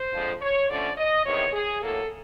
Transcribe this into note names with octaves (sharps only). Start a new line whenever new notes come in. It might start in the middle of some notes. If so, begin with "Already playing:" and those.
Already playing: C5
F2 D3 F3 G#3
C#5
D3 F3 A3 C#4 D5
D#5
E2 C3 D#3 C#5
G#4
A2 F#3 A#3 A4